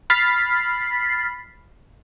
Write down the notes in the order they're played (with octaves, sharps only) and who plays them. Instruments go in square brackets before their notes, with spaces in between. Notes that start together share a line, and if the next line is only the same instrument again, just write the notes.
[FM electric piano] B5 F6 A6 B6 C7